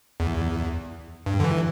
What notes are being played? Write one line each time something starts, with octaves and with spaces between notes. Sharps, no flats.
E2
G2
D3
E3